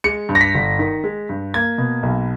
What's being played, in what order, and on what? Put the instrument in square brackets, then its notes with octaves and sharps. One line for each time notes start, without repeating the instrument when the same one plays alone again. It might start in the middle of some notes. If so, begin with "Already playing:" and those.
[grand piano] G#3 C#7
G2
A#6
B6
G1
D#3
G#3
G2
A#3 G#6
B2
B1